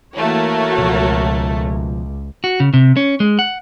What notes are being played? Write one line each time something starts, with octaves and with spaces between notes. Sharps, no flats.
E3 A3 A#3 F#4 A#4 C#5
C#2 B2 F3
F#4
C#3
C3
C#4
G#3
F#5